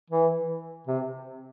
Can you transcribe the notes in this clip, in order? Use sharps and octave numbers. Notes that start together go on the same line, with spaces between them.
E3
C3